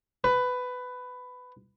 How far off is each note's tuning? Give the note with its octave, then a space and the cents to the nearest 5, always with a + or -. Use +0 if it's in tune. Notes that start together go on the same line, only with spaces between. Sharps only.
B4 +15